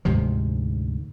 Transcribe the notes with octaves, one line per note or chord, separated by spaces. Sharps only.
D2 G#2 C3 F3